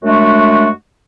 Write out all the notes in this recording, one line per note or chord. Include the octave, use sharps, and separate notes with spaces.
F#2 G#3 A3 D4 F#4